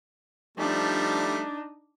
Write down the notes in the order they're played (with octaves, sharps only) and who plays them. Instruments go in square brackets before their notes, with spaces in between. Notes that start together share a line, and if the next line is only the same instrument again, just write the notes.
[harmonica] F3 G3 A3 [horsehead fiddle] D4 D#4